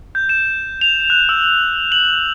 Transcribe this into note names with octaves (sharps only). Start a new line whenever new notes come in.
G6
E7
F7
F#6
E6
F#7